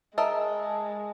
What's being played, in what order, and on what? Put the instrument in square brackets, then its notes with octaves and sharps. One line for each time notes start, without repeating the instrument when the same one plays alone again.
[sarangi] G#3 [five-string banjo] A#4 D#5 E5 [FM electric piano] A5